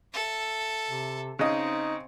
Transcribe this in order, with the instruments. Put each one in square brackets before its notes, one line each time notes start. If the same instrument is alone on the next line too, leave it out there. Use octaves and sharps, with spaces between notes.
[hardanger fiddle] A4 E5
[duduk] C3
[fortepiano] C#3 D#5 [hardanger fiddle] C4 [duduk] D#4